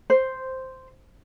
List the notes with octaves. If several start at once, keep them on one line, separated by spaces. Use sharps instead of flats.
C5